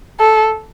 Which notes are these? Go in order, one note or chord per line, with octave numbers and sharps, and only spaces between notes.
A4